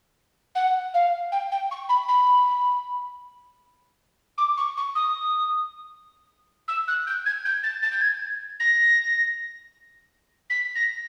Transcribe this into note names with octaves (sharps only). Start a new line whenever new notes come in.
F#5
F5
G5
G5
C#6
B5
B5
D6
C#6
C#6
D#6
E6
F#6
G6
G#6
G6
A6
A6
G6
G#6
A#6
B6
A#6